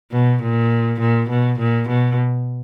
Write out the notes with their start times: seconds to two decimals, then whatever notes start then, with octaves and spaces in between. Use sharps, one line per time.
0.12 B2
0.42 A#2
1.00 A#2
1.30 B2
1.59 A#2
1.89 B2